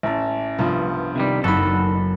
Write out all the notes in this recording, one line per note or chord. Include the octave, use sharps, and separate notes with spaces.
A1 C#4 A5
C2 G2 F3 B3
C3 D#3 G3
F#1 D#3 F#4 A4 B5